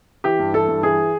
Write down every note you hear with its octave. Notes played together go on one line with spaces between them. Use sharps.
E3 G4
G2
E3 A4
G2
E3 G#4